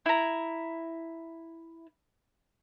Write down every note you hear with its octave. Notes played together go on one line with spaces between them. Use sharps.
E4 A#5